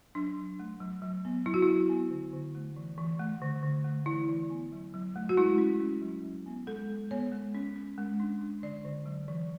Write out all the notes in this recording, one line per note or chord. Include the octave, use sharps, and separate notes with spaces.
F#3 D4
F#3
A3
F#3
F#3
B3
F#3 E4
F#4
E4
F#3
B3
D3
D3
A3
E3
E3
A3
D3
D3
A3
E3 E4
E3
B3
F#3
F#3
A3
F#4
G#3 E4
C#4
C#4
F#3
F#3
B3
G#3 A4
G#3
B3 C#5
G#3
C#4
C#4
G#3
D4
D4
D3 D5
D3
F#3
E3